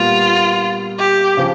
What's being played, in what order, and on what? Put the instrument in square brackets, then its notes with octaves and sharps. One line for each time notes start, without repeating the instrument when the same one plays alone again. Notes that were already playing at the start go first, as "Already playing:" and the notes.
Already playing: [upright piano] A#2 G3 B3 [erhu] F4
[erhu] G4
[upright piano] C#3 F3